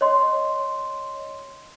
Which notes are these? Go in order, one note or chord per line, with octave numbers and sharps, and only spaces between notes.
C#5 D#5 C6